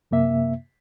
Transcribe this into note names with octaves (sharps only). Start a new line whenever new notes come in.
F#2 C3 A#3 E5